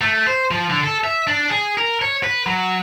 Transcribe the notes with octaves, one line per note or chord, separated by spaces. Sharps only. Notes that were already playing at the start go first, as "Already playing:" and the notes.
A3
C5
F3
D3
A4
E5
D4
G#4
A#4
C#5
B4
F#3